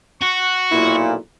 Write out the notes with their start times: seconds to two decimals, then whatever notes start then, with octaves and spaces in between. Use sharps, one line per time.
0.22 F#4 C#6
0.72 B1 A#2 E4